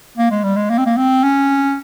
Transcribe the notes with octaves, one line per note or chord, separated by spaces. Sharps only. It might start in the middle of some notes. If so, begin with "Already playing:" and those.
A#3
G#3
G3
G#3
A#3
C4
A#3
C4
C#4